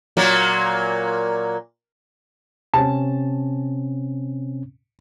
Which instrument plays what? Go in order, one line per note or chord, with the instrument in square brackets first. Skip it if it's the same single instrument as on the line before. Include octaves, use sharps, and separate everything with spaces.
[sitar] A#2 F#3 A#3
[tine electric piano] C3 C4 C#4 [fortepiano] A5